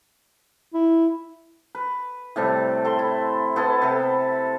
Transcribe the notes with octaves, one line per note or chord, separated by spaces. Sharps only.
E4
B4
A2 C3 G3 A4
A4 C6
E4
B3 E4 A4
C3 A4 B4